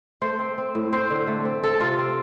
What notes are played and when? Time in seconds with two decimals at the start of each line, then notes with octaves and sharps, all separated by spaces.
0.21 A3 C5
0.39 C4
0.58 C4
0.75 A2
0.92 C4 C5
1.10 D3
1.27 A3
1.45 C4
1.63 C4 A4
1.80 C3 F4
1.98 C4